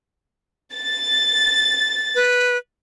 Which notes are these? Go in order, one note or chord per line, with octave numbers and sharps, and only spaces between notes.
A6
B4